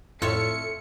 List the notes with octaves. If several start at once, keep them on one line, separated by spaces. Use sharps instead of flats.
F2 A2 F4 A4 C#5 E5 C#7